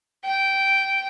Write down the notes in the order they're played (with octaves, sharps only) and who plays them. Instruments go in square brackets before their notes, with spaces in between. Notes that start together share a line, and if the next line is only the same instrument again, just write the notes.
[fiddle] G5